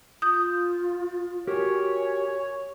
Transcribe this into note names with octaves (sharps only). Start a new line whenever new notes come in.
F4 D#6 G6
F#4 G4 A#4 C#5 G#5